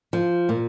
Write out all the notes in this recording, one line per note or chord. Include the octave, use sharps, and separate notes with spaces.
F3
A#2